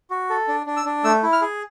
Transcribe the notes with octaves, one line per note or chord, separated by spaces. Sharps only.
F#4
A4
D4
D4
E6
D4
A3 E6
E4
F6
G#4